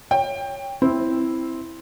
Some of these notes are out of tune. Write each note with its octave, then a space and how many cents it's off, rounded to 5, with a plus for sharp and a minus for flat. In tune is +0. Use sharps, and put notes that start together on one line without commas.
C#5 +5 G5 +20
C4 +0 E4 +0